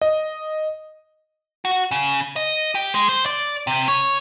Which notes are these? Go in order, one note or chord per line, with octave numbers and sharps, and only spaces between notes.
D#5
F#4
C#3
D#5
G4
G#3
C5
D5
C3
C#5